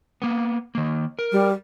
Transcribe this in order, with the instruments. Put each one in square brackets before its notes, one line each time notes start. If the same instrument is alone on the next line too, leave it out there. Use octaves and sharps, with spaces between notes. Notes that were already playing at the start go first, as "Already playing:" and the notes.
[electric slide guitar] A#3 B3
D#3 A#3
A#4
[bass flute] G3